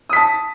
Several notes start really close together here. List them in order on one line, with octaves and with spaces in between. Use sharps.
D#6 B6 A5